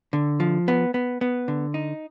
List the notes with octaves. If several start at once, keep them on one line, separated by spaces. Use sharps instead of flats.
D3
F3
B3
B3
B3
D3
D#4